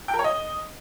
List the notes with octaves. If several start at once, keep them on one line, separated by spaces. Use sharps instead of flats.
G5
A#4
C#5
D#5